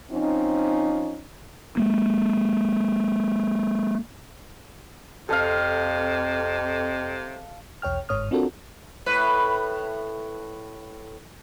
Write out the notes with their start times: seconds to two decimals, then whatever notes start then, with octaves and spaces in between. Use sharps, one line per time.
0.12 F3 C4 C#4 D#4
1.77 G#3 A#3
5.29 F2 C3 A4 D#5 F5
7.82 B1 E2 C#5 G5 F6
8.09 G1 G#2 C#5 D#6 F6
8.31 C4 D4 F4 F#4 A4 A#4
9.06 A2 B4